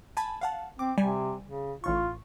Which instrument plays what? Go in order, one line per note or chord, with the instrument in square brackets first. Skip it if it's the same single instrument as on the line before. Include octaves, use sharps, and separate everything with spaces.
[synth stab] G#5 A5 B5
F5 F#5 A5
[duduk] C4 [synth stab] D6
[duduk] C3 [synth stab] G3 G#5
[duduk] C#3
[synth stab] A1 A2 C#6 [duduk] F4